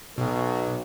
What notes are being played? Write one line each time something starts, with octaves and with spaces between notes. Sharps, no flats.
B1 B2